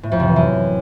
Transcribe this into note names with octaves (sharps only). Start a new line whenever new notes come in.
A2
F2
C3
E3
F#2